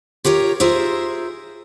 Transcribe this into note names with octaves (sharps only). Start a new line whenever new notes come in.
F4 G4 A#4 C#5
F4 G#4 A#4 C5 E5